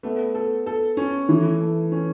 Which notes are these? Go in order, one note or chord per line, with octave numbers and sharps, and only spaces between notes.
A3 B3
A4
A4
C#4
E3 A3
A3
C#4